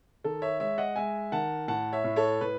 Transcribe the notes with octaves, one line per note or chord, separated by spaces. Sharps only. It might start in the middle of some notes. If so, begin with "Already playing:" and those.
D#3 A4
C#5 E5
G#3 C#5 E5
D#5 F#5
G#3 E5 G#5
D#3 F#5 A5
A2 F#5 A5
C#5 E5
A2
A4 C#5
A2 B4